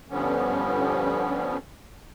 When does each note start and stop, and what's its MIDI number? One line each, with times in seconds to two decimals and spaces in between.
0.10 1.57 43
0.10 1.57 50
0.10 1.57 53
0.10 1.57 55
0.10 1.57 59
0.10 1.57 61